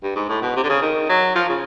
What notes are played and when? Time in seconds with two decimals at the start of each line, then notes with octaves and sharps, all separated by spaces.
0.03 G2
0.16 G#2
0.29 A2
0.42 B2
0.56 C3
0.63 D3
0.69 C#3
0.82 D#3
1.09 F#3
1.36 F3
1.49 C#3